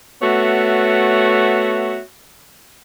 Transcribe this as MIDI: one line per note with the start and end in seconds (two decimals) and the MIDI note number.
0.22 2.00 57
0.22 2.00 59
0.22 2.00 66
0.22 2.00 73
0.22 2.00 76